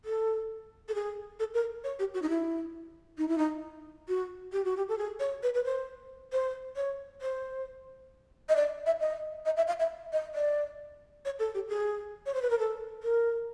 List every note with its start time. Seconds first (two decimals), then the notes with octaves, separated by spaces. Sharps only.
0.05 A4
0.88 A4
0.94 G#4
1.39 A4
1.54 A#4
1.84 C#5
1.99 G4
2.14 F#4
2.22 D#4
2.29 E4
3.18 D#4
3.28 E4
3.38 D#4
4.08 F#4
4.52 G4
4.64 F#4
4.77 G4
4.88 A4
4.98 G#4
5.19 C#5
5.43 B4
5.54 B4
5.64 C5
6.32 C5
6.76 C#5
7.21 C5
8.49 D#5
8.56 D5
8.86 E5
9.00 D#5
9.45 D#5
9.56 E5
9.67 F5
9.79 E5
10.12 D#5
10.35 D5
11.25 C#5
11.39 A4
11.54 G4
11.68 G#4
12.26 C#5
12.34 C5
12.42 B4
12.50 A#4
12.59 A4
13.03 A#4